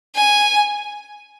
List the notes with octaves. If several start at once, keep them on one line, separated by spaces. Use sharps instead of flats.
G#5